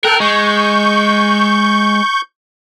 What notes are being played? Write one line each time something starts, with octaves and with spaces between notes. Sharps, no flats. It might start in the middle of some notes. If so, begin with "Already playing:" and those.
A4 A#4 G5 F#6
G#3 C#6 G6